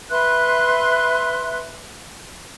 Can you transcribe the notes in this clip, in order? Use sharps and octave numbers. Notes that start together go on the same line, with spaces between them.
B4 E5 C6 F#6